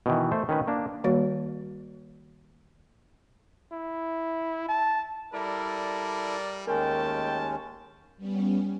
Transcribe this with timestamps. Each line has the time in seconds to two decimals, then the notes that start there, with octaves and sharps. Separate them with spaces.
0.06 B2 D#3 E3
0.31 A3 C5
0.49 D#3 C#4 B4
0.67 A#3 D4
1.04 D#3 G3 A#3 F#4 C#5
3.72 E4
4.69 A5
5.34 G3 E4 A4 A#4 D5
6.67 D#2 G#3 A3 C#4 A#4 G5 A5
8.17 G3 B3 C#4